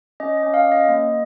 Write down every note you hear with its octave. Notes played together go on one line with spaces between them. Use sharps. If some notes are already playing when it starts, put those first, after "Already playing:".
C#4 D#5
D#5
C#4
F5
C#4
D#5
A#3